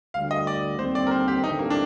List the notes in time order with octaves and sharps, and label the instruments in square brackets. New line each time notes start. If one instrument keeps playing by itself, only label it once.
[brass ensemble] D2 D3 G3 [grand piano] F5
[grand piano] D#5
D5
[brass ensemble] D#2 D3 G3 C4 [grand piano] C5
[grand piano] D5
A#4
C5
G4
[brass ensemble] A1 G2 D3 A3 C4 [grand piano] D#4
[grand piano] A#3
D4